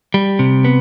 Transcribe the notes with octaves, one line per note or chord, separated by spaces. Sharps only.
G3
C3
B3